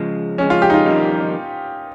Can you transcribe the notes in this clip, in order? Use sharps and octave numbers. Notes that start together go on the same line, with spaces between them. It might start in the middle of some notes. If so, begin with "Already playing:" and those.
Already playing: C#3 F3 G#3
F2 C#3 G#3 C#4
F4
G4
D#4
F4
F2 D#3 G3 A#3 D#4